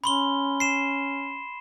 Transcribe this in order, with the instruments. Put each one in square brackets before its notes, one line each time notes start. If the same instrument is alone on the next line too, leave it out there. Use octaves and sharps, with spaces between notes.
[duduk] C#4 [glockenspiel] B5 C6 G7
[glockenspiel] C7 E7